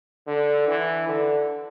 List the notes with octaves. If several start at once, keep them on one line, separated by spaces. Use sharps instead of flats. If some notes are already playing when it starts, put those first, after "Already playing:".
D3
E3
D3